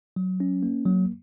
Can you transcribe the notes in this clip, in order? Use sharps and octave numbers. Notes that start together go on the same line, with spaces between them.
F#3
C#4
A#3
F#3